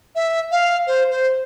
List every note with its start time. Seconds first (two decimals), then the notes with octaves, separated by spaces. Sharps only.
0.15 E5
0.52 F5
0.87 C5
1.10 C5